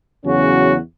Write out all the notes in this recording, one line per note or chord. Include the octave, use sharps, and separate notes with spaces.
E2 C#3 F#3 C#4 F#4